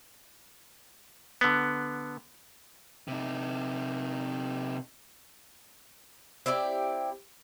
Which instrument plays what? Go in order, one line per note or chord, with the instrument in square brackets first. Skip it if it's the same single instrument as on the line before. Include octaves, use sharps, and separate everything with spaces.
[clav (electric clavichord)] D3 B3
[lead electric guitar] C3 D#4
[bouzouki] C4 E4 G4 D5